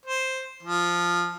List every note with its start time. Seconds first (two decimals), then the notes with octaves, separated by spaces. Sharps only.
0.06 C5
0.63 F3